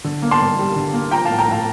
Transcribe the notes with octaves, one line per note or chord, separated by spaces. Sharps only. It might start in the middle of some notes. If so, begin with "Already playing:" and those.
D3
A#3
A5 C6
G2
G3
D3
A#3
F3 G5 A#5
A2 F5 A5
G5 A#5
A2 F5 A5